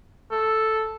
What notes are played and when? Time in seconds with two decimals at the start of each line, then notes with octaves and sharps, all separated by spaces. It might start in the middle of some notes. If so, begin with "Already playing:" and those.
0.32 A4